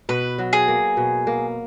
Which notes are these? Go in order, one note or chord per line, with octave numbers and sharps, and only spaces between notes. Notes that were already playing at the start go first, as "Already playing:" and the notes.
B2 B4
F#3
G#4
A#3
B2
A#3